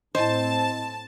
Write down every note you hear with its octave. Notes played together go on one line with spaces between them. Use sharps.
A2 C4 E4 C5 D#5 A5